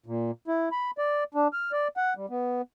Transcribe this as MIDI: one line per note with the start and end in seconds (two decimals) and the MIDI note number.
0.06 0.31 46
0.48 0.69 64
0.72 0.91 83
0.98 1.24 74
1.34 1.48 62
1.53 1.72 89
1.72 1.88 74
1.97 2.14 78
2.17 2.26 55
2.29 2.62 59